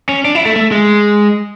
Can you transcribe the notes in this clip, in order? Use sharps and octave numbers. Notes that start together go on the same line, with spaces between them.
C#4
D4
E4
A3
A3
G#3